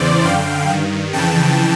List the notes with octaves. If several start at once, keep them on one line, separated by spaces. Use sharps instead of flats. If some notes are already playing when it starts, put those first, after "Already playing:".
Already playing: E2 C#3 E3 C5 D5
F#2 D3 F5 G5
G2 D#3
F2 C#3 E3 G5 A5